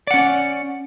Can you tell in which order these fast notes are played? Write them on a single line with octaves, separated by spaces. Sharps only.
D5 F#5 C#4